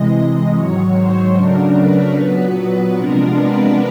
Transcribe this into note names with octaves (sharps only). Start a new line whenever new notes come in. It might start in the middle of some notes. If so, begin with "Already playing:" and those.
Already playing: C3 E3 G#3 D#5
G#2 D#3 F#3 C#5
C5
C#3 F#3 A3 D4 A#4
B4
A#2 F#3 B3
B4
C3 F3 G#3 B3 D4 A#4
B4